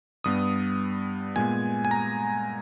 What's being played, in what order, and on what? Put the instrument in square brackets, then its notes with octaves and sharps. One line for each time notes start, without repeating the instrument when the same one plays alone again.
[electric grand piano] G2 G3 B3 D#6
A#2 G#3 B3 G#5
G#5
A#5